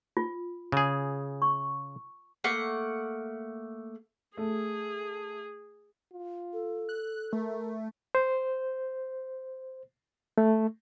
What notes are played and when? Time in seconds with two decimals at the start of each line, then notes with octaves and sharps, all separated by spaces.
0.17 F4
0.72 C#3 G#4
1.42 C#6
2.44 A3 A#3 F#5
4.37 A3 G#4
6.13 F4
6.53 A4
6.89 F#6
7.33 A3 A#4
8.15 C5
10.38 A3